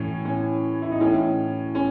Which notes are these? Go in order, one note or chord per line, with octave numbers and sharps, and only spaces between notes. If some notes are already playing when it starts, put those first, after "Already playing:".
Already playing: A2 E3 C#4
C#4
E4
D#4
A2 E3 C#4
C#4